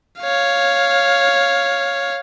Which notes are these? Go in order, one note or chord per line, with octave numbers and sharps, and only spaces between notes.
C#5 F5